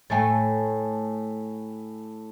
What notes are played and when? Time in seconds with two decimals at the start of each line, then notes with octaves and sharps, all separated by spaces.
0.10 A2 A3 G5 G#5 A6